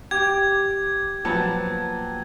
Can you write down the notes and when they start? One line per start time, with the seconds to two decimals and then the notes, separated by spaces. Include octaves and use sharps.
0.11 G4 G#6
1.25 A#2 F3 F#3 B3 A5